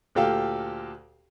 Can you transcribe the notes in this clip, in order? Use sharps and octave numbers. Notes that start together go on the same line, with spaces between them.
D2 A#2 G4 A4 F5 G5